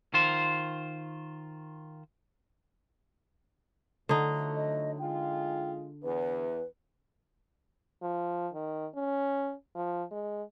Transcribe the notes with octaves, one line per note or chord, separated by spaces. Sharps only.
D#3 F4 C5
D3 F3 F#3 A3 D#4
D#5
G#3 F4 G5
E2 B4
F3
D#3
C#4
F3
G#3